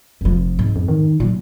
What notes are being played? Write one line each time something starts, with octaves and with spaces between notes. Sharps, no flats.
F1 F3
G#2
F2
D#3
A#2 F#3